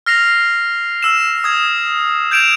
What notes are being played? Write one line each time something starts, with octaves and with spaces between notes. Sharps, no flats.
F6 A#6 C7 F7
E6 E7
D#6 G#6
G6 G#6 D7 E7 F7